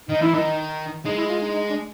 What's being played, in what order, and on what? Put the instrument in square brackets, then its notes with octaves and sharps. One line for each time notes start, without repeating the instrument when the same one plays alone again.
[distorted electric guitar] D#3 [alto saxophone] D#4
[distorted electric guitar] E3 [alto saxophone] E4
[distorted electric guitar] D#3 [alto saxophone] D#4
[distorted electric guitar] G#3 [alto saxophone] D#4
[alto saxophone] E4
F4
D#4
D#4
D4